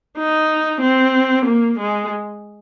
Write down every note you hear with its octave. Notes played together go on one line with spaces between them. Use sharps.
D#4
C4
A#3
G#3